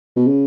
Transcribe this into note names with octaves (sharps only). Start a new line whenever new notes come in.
B2
C#3